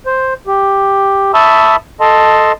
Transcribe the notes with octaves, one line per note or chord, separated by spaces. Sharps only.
C5
G4
E5 A5 B5 C#6 D#6 E6
A4 D#5 A5 C6